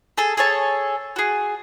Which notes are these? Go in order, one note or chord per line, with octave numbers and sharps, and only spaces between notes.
G#4 A4
G#4 A4 C#5 A5
F#4 G#4